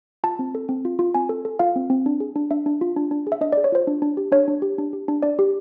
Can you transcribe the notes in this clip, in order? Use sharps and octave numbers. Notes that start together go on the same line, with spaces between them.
F4 A5
C4
A4
C4
F4
F4
C4 G#5
A4
A4
F4 F5
C4
C4
D4
G#4
D4
D4 E5
D4
F4
D4
D4
G#4
E5
D4 D#5
G#4 D5
C#5
F4 C5
D4
D4
G4
D4 C#5
D4
G4
D4
G4
D4
D4 D5
G4